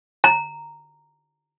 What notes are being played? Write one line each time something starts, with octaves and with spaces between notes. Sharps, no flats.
A#5